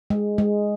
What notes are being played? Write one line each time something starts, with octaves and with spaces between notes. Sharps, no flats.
G#3
G#3